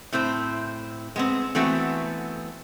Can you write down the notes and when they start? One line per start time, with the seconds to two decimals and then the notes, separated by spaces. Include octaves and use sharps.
0.12 A2 C4 E4 C5
1.16 G#3 B3 C4
1.55 E3 A3 B3 C4 F#4